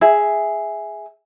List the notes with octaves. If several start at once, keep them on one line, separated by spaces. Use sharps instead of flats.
G#4 E5